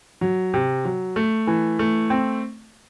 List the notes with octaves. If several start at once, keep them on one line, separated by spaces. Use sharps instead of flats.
F#3
C3
F#3
A3
E3
A3
C4